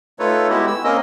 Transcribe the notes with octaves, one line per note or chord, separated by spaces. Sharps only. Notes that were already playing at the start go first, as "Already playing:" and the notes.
A3 D#4 F4 A4 B4 C#5
G#3 B3 E4 F#4 G4
E6
A#3 C4 C#4 A#4 D#5